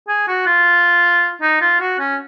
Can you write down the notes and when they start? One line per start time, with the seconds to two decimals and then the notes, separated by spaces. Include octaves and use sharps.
0.08 G#4
0.28 F#4
0.47 F4
1.41 D#4
1.61 F4
1.80 F#4
1.99 C#4